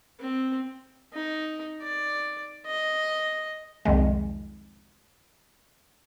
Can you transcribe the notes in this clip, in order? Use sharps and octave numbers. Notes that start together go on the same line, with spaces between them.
C4
D#4
D5
D#5
C2 F2 D#3 G#3